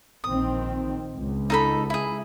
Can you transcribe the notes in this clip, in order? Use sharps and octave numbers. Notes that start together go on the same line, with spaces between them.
A#1 D#3 C4 D#6
C#2
D#4 A4 B5
E4 G#4